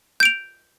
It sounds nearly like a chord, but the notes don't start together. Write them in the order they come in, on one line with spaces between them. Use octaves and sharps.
G6 D7 F7